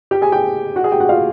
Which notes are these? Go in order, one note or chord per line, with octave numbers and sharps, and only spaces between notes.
G4 G5
G#4 G#5
G4 G5
F#4 F#5
G#4 G#5
G4 G5
F#4 F#5
F4 F5